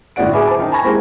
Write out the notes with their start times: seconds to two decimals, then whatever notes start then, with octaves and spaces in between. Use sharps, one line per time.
0.16 G1 A2 F#4 D5 F#5 D7
0.34 G#4 B4 E5 G#5 B5 D6
0.45 C5 A5 D6
0.59 D#3 D#4
0.72 G#5 A5 B5 C#6 G#6 A#6
0.84 G#3 A#3 C4 E4 G4